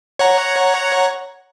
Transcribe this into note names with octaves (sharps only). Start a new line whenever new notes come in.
C#5 F#5 A#5